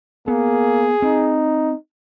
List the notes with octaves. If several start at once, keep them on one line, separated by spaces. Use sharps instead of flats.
A#3 B3 G#4
C4 D#4